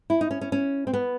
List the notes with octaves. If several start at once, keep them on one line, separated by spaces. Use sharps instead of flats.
E4
D#4
C#4
C#4
C#4
C4
B3